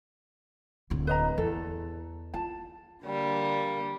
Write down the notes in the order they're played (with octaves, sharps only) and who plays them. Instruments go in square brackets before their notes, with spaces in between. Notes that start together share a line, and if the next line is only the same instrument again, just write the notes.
[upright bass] D1 D3
[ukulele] B4 D#5 A#5
[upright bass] E2 [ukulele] A4
[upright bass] F4 [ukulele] A5
[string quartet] D3 G3 A#3